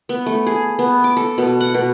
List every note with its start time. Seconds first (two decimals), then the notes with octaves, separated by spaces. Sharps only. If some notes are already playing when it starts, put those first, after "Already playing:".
0.09 B3
0.26 A3
0.46 G#4
0.79 B3
1.04 D6
1.17 A4
1.38 B2
1.60 F#5
1.74 B2